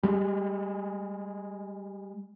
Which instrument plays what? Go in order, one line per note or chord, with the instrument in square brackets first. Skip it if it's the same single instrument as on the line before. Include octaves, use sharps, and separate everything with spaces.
[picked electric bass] G3 G#3